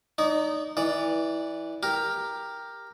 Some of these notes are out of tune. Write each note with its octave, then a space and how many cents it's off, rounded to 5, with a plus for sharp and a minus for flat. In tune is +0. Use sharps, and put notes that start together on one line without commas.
D#4 -15 D5 -35
E3 -15 D5 +0
G4 +10 A#4 +0